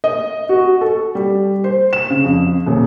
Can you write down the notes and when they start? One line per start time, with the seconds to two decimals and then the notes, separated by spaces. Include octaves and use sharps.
0.04 D#5
0.49 F#4
0.81 A4
1.15 G3
1.64 C5
1.93 E7
2.10 C#3
2.25 F2
2.66 D#1